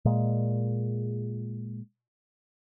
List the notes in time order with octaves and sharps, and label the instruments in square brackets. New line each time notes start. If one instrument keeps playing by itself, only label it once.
[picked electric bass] A#2 G#3